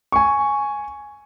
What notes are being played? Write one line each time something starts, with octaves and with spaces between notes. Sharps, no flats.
G#5 C#6